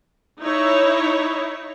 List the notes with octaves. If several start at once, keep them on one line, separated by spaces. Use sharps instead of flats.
D#4 E4 C#5